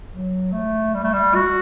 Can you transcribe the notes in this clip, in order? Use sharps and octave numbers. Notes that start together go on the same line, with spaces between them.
F#3
A3
G3
A3
G3
F#4